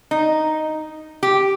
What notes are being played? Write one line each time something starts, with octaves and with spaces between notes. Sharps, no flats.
D#4
G4